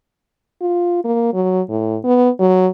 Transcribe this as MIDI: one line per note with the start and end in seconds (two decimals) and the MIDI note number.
0.61 1.01 65
1.05 1.29 58
1.33 1.61 54
1.69 1.97 45
2.04 2.29 59
2.40 2.68 54